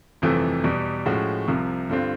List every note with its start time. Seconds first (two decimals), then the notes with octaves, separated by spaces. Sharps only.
0.22 G1 F2 C3 E3 A3
0.64 E2 B2 G3
1.06 A2 F3 G#3 C#4 F#4
1.48 C2 C3 F3
1.89 G2 D3 G3 C4 F4